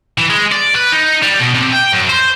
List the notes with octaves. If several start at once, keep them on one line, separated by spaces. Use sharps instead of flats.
E3
G#3
D5
B4
D#4
G3
B2
C3
G5
F#2
C5